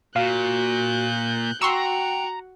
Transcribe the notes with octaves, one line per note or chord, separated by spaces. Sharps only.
A#2 F#4 F5 F#6 G6
F#4 F#5 G5 A#5 C6 C#6 E6